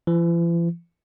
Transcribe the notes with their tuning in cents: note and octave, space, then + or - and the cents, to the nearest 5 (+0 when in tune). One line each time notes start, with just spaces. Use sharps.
E3 +45